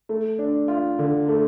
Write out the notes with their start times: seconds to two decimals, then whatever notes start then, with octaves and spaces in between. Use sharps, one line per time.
0.09 A3
0.39 D4
0.68 F4
0.99 D3
1.28 A3